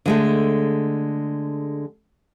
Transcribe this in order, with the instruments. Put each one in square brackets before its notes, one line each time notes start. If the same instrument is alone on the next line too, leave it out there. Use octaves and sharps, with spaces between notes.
[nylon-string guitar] D3 G#3 A3